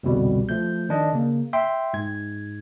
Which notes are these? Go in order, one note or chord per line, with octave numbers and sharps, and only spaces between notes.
C2 F2 B2 D3 G3
F3 A3 G6
D#3 D4 D#5
C#3 A#3
E5 G5 C6
G#2 G#6